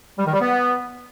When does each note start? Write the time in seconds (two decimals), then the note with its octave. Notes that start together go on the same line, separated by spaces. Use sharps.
0.18 G3
0.26 D#3
0.33 G3
0.41 B3